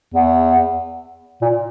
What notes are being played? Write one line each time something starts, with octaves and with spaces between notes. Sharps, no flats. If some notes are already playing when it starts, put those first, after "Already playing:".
E2
A#2